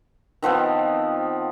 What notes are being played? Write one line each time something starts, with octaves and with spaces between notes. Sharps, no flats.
D#3 F3 B3 C4